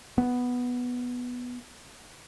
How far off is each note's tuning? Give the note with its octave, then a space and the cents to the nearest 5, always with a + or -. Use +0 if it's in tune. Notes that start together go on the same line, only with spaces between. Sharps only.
B3 -5